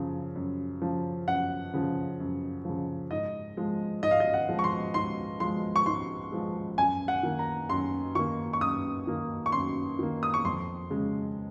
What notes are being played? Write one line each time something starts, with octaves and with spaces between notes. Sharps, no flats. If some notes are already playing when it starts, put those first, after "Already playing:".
Already playing: F#2 C#3 F3
F#2
C#3 F3
F#2 F#5
C#3 F3
F#2
C#3 F3
G#2 D#5
F3 G#3
G#2 D#5
F5
D#5
F#5
F3 G#3
C#6
C6
G#2 C6
F3 G#3 C6
C#6
G#2 C6
F3 G#3
F#2 G#5
F#5
D#3 A#3
A#5
F#2 C6
D#3 A#3 C#6
C#6
F#2 D#6
D#3 A#3
C#6
F#2 C6
D#3 A#3
D#6
C#6
F2 C6
C#3 G#3